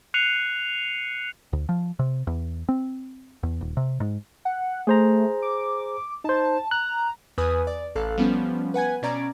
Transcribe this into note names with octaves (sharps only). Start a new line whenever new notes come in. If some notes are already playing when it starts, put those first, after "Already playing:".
F#6 C7 C#7 D#7 F7
D2
F3
C3
E2
C4
E2
D#1
C3
G#2
F#5
A3 G#4 C5 A#5
D6
D#4 C5 A5
A#5 F#6
E2 B4 G#5 D#6
D5
A1 A4 F5 F#6
F3 G3 B3 C#4
B4 F#5 G#5 G#6
B2 C#4 D5 A#5 G#6 D7